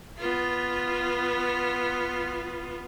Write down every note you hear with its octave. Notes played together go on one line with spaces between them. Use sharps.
B3 F4